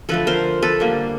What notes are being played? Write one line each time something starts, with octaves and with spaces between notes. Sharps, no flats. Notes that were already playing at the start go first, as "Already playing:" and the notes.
D3 F3 A3 A4 B4
A#4 C5
A4 B4
D3 G3 A#3